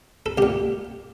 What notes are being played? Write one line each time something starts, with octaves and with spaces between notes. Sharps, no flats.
A4
C2 A#2 G4